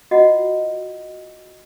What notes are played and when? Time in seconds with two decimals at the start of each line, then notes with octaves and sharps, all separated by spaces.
0.11 F4 F#4 D#5 F#5